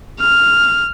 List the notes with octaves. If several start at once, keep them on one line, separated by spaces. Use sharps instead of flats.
F6